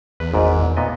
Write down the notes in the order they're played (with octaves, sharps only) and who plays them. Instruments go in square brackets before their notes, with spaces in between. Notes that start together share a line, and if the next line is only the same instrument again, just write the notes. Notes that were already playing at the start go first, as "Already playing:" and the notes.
[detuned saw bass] E2 [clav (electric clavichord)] B4
[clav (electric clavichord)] G#1 G#2 D5
A#2 B3 D#5